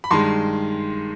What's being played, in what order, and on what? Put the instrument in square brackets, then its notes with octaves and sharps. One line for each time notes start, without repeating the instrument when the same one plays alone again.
[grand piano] B5
G2 D#3 G#3 C6